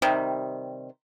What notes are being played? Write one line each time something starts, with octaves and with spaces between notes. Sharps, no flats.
C3 D#3 G3